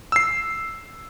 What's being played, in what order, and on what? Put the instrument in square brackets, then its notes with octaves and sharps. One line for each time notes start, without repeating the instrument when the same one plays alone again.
[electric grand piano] E6 C7